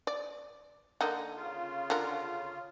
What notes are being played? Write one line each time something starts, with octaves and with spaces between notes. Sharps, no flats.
D5
D3 A#3 D#4
C#3 F4
D3 A#4